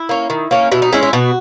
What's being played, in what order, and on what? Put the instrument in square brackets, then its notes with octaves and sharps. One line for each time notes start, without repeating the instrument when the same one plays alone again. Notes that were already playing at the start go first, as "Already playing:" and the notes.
Already playing: [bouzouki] E4
A#3 C#4
D#3
A#3 C#4
B2 E4
D#4
G#3 C#4 E4
E4
B2 F#4